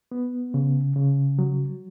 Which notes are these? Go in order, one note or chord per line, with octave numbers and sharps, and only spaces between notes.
B3
C#3
C#3
F#3